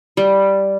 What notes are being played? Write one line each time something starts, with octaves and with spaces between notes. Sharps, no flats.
G3